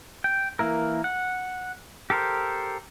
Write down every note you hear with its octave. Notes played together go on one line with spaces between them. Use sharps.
G5
E3 A#3 E4 A#4
F#5
G4 A4 A#4 C5